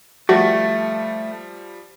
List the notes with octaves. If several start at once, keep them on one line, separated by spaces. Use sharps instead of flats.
F3 G3 A3 F#4